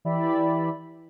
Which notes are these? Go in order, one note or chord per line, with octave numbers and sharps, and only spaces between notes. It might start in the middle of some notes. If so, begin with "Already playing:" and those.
E3 E4 G4 D5 E5 B5